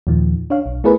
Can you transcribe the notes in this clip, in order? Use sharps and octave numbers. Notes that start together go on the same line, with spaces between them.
D#2 A#2 D#3 F3
D4 C#5 F5
B1
A3 B3 E4 G#4 A#4 B4